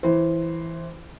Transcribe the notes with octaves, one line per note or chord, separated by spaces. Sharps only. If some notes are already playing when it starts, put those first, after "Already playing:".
E3 C5